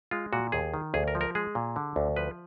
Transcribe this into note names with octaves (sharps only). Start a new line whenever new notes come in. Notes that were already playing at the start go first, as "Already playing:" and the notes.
G#3 F4
A#2 F#4
D#2 G#4
D#3
D2 G#4
A#4
F3
A#4
G#3 G#4
A#2
D3
D2
F3 B4